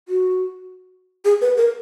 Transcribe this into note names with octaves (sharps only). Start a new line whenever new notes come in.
F#4
G#4
B4
A#4